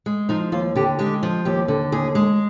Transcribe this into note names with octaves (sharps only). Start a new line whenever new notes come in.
G#3
F3 D#4
D#2 F4
D3 G4
G#3 G4
F3
D#2 G4
D3
D#2 G#4
G#3